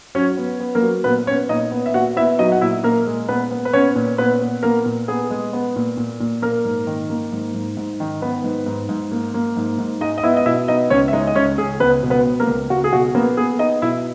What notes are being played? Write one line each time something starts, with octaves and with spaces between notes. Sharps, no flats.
F#3 C#4 C#5
B3
B3
A#3 A#4
F#3
A#2 B3 B4
B3 C#4 C#5
A#2 D#4 D#5
B3
E5
A#2 F#4 F#5
B3 E4 E5
F#3 D#4 D#5
F#5
A#2 E4 E5
A#2 A#3 A#4
G#3
A#2 B3 B4
B3
B4
B3 C#4 C#5
A#2
A#2 B3 B4
B3
A#3 B3 A#4
A#2
B3 G#4
G#3
B3
A#2
A#2
A#2
A#3 A#4
G#2
D#3
A#3
G#2
G#2
G#2
D#3
D#3 B3 B4
G#2
G#2
G#2
A#3
A#3
G#2
G#2
G#3 D#4 D#5
D#5
B3 E4 E5
D#5
B2 E4 E5
B3 D#4 D#5
C#2 C#4 C#5
E5
G#3 D#4 D#5
D#5
C#2 C#4 C#5
C#2 G#4
C#2 B3 B4
B2
B3 B4
B3
A#3 A#4
C#2
C#2 F#4
G#4
B2 F#4
A#3 B3 A#4
B3 G#4
B3 D#4 D#5
B2 E4 E5